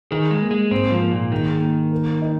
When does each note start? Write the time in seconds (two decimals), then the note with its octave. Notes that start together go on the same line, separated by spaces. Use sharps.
0.11 D#3 G#4
0.31 G#3
0.41 A#3
0.51 G#3
0.71 G#2 C4
0.91 F3
1.02 A#3
1.11 A#2
1.31 D#3 G#4
1.61 A#3
1.92 A#4
2.22 D#4